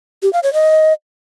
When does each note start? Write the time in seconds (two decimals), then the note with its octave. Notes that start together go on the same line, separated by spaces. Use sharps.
0.23 G4
0.33 F5
0.43 C#5
0.54 D#5